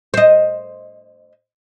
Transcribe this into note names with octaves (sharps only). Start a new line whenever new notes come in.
C5 D#5